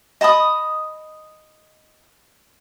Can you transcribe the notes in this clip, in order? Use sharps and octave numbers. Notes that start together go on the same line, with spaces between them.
D#5 A5 B5 D#6